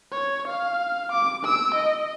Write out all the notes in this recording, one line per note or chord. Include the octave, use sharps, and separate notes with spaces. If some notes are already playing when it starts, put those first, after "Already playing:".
C#5
F5
D6
E6 D7
D#5